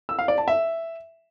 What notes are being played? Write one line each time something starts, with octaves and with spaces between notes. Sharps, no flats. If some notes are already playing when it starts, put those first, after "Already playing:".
E6
F5
D5
A5
E5